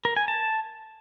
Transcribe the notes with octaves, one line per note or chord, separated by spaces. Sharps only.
A#4
G#5
A5